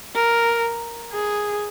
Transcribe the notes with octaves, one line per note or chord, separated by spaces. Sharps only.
A#4
G#4